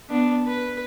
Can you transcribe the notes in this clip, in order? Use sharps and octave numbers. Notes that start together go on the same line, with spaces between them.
B3 D4
B4